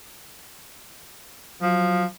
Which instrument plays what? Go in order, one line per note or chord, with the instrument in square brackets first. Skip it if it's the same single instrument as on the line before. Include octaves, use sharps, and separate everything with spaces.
[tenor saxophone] F3 [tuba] F#3